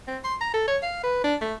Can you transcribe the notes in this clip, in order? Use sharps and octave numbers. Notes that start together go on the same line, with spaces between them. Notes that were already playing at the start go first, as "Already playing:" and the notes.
C4
C6
A#5
A4
C#5
F5
B4
D4
A3